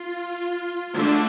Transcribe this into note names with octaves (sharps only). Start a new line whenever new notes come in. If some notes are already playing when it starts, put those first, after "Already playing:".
Already playing: F4
D3 A3 D4